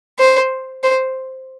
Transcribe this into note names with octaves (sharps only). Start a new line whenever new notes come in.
C5
C5